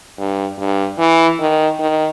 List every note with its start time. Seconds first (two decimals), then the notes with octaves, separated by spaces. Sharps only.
0.19 G2
0.59 G2
0.99 E3
1.40 D#3
1.80 D#3